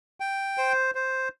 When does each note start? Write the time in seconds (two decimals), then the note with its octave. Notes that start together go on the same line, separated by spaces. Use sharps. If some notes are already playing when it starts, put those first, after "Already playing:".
0.20 G5
0.58 C5
0.95 C5